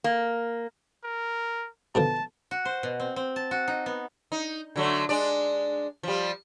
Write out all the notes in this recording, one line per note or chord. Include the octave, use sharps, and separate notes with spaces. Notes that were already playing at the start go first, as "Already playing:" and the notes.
A#3
A#4
B2 D3 F3 A5
F#4
C5
B2
C4
C4
A5
F#4
D#4
B3
D#4
D3 F#3 A3
G#3 D4 D5
F3 G3